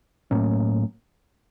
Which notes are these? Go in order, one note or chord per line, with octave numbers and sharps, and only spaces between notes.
A2 F#3 A#3 C#4